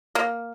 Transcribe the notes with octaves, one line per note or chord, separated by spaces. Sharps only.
A#3